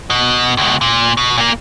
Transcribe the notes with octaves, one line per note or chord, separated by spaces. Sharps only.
B2
C#2 B2
A#2
B2
A#2 A#3